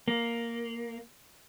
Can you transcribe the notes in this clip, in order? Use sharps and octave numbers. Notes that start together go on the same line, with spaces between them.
A#3